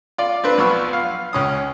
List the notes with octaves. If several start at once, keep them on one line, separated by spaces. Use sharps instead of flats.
F4 D5
C4 D4 B4
B1 F3 B3 B5 C#6 E6
F5
C#2 C#4 D#6